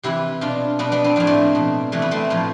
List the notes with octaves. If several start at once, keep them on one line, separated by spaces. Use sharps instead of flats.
C3 E3 E4 G4
B2 D4 F4
B2 B3 D4
B3 D4
C4
A2 F3 D4
A3 C4
B2
C3 E3 A3
B3
A3 C4
A2 F3